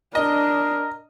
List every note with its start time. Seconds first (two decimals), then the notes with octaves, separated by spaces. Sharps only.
0.15 D4 A#4 D#5